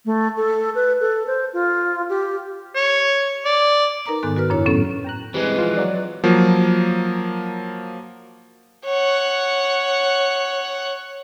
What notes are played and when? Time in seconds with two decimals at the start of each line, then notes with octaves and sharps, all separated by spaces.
0.05 A3
0.37 A4
0.75 B4
1.01 A4
1.27 C5
1.53 F4
2.10 G4
2.75 C#5
3.45 D5
4.06 D#4 A#4 B4 A#5 D6
4.23 G#2 D#3 B3 A4 G#5 F#6
4.37 F#4 A#4 B4 F6
4.50 F#2 C#3 D4 E4 C#5
4.66 A2 F#3 B3 C#4 A4
5.04 G5 A#5 F#6
5.34 E3 G3 G#3 C4 B4
5.58 F3 F4
5.77 F#3 D5
6.24 F3 F#3 A#3
8.85 C#5 F#5